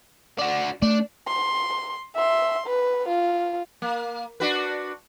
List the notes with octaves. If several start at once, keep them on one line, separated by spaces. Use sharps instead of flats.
D4 F#4
A3 D4
C6
E5 C6
B4
F4
A#3
D4 F#4 B4